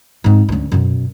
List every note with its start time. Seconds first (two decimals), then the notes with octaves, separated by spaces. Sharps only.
0.24 G#2 C4
0.49 D2 C#4
0.72 F#2 B2